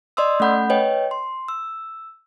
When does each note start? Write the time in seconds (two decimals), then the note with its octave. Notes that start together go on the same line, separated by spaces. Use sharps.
0.17 D5 D#5 C6 D#6 E6
0.40 A3 C#4 A4 F#5 B5 G6
0.70 B4 C#5 D#5 G5
1.11 C6
1.48 E6